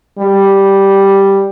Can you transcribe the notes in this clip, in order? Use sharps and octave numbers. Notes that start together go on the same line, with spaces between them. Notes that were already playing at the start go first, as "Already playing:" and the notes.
G3